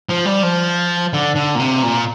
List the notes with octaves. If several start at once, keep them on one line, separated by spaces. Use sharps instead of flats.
F3
G3
F3
D3
D3
A#2
C3
A#2